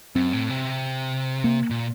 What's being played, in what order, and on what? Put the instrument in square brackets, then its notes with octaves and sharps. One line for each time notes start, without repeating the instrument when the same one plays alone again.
[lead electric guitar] F#2 [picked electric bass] C4
[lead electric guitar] A2
C3
[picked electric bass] A#3
[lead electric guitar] A#2